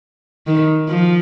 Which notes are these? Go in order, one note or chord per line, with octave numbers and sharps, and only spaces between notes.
D#3
F3